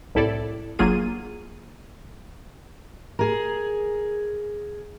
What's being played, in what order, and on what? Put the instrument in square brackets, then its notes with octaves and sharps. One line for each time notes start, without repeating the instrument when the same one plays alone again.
[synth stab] C2 A2 E4 A4 D5
G1 F#3 A#3 F4 G#4 D#7
[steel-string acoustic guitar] G#4 A#4